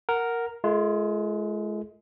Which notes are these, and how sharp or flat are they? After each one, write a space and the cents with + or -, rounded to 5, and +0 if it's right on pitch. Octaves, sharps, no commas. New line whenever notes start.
A#4 +0 F#5 +0
G#3 +30 F4 -30 A#4 -40